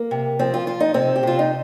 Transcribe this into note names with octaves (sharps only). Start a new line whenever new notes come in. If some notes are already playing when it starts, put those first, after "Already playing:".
Already playing: A#3
C3
F3 C4
F4
F3 F4
D#4
C3 C4
G4
C3 F4
D#4